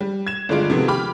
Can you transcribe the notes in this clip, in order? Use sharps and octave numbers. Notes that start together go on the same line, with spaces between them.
G3
G#6 E7
G1 D3 G#3 D4 F4 D7
C3 D#3 F3 G#3 A3 B3
G4 B5 D6 F6